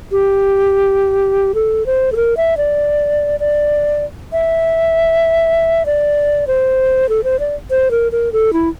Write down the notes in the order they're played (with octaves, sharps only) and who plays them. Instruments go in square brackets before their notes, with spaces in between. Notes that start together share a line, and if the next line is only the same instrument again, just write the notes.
[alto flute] G4
A4
C5
A4
A#4
E5
D5
D5
E5
D5
C5
A4
C5
D5
C5
A#4
A#4
A4
E4